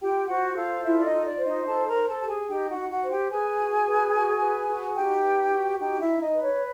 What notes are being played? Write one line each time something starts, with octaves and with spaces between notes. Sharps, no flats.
F4 G4 G5
F#4 C5 F#5
F4 A4 F5
E4 F4 E5
D5
D#4 D#5
F4
D5
C5
D#4 D#5
D#4 A4 A5
A#4 A#5
C5
A4 A5
G4 A5
G#4 G#5
D#4 G4 G5
F#4 F#5
D#4
F#4 F#5
C5
G4 G5
G#4 B4 G#5
F#4
B4
F#4
B4
F#4
D#4 G4 G5
B4
F#4
D#4 G4 G5
E4 E5
D#4
D#4 D#5
B4
C#5